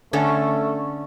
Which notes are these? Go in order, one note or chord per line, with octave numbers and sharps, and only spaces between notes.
D3 A3 C#4 A4